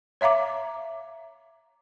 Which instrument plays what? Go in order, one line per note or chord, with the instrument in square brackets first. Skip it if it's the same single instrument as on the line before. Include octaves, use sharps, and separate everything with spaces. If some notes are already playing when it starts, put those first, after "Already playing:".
[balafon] C#5 E5 F5 A#5 D6